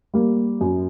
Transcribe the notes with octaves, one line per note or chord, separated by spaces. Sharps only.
G3 A#3
F#2